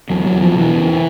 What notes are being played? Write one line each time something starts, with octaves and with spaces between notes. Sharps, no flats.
E2 F#3
F#3
E2
F3
B2 E3
C#3